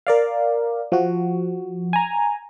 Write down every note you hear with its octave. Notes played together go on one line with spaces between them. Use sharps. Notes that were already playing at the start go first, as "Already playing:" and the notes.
A#4 D5 F5
F3 F#4
G#5 A#5